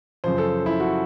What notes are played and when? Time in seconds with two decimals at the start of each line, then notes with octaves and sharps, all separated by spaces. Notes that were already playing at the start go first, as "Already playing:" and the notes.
0.24 F#2 C#3 F3 C5
0.38 A4
0.66 E4
0.80 F#4